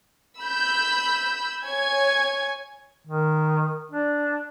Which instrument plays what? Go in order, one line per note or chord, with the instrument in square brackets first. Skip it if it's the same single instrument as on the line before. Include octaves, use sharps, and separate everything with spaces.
[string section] B5 E6 G6
C#5 G#5 G#6
[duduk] D#3
D4